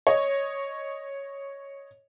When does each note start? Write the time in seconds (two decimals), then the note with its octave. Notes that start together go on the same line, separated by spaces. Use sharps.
0.07 C#5 D#5